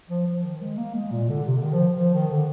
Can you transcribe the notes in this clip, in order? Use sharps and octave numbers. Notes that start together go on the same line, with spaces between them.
F3
F3
D#3
G#3
A#3
G#3
A#2
D3
C3
D3
D#3
F3
F3
D#3
D3